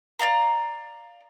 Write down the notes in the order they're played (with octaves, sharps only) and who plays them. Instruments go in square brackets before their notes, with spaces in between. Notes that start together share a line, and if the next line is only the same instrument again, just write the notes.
[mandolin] D5 D#5 F5 A#5